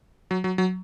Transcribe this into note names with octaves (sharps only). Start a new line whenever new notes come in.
F#3
F#3
F#3